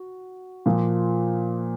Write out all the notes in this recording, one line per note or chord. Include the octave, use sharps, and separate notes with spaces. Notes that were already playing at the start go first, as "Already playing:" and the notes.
Already playing: F#4
A#2 F3 A#3